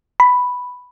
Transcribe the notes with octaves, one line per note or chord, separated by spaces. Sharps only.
B5